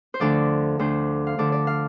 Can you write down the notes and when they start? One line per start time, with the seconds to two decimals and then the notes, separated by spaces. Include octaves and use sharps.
0.14 C5
0.20 D2 D3 F3 D5
0.79 D2 D3 F3 C5
1.27 F5
1.38 D2 D3 F3 D5
1.52 D5
1.67 F5